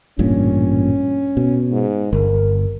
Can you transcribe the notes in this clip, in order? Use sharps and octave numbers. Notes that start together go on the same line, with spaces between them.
A1 G2 A#2 C#4
B2
G#2
G1 A#4